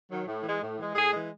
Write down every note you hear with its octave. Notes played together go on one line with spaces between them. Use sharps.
D#3 F#3
A2
E3 G#3
A2
E3 G#3
A2 G#4
E3 G#3